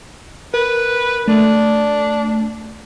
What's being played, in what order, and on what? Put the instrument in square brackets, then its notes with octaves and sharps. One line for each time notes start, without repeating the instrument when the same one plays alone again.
[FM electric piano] A#4 [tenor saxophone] B4
[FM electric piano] A3 [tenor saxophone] D4